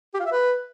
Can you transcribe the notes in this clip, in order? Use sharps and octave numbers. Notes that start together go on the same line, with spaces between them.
G4
F4
E5
B4